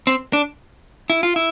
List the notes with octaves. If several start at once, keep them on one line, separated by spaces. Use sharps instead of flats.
C4
D4
E4
F4
E4